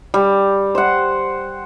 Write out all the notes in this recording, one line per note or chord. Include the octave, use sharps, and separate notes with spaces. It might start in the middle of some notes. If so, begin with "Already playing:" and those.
G3
C5 F#5